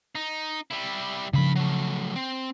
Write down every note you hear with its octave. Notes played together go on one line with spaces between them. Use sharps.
D#4
G3 E4
G2 C#3 F3 B5
F#3 A3
C4